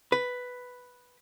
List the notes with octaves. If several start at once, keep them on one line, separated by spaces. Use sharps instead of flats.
B4